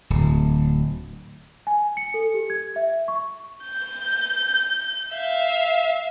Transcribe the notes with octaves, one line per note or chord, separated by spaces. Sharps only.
D1
G#5
C#7
A4
G4
G#6
E5
C#6
G6
E5 F5